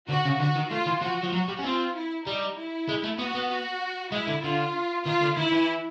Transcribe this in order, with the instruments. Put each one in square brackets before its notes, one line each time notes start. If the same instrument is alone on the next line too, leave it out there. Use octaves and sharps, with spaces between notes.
[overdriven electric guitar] D3 [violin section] F#4
[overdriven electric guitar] C#3
[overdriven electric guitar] D3 [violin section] F#4
[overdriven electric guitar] D#3
[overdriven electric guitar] A3 [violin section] F4
[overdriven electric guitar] E3
[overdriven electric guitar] F3 [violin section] F#4
[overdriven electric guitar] F3
[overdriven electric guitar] F#3 [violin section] F#4
[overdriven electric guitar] G3
C#4
[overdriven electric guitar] C4 [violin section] F4
[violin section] E4
[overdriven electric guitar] G3 [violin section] D#4
[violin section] E4
[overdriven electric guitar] G#3
A3
[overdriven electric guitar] B3 [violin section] F#4
[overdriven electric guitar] B3
[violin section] F#4
[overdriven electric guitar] G#3 [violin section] E4
[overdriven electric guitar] D3
[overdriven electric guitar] D3 [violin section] F4
[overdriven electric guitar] D#3 [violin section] F4
[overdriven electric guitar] D3
[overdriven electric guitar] D#3 [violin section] E4
[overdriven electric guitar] E3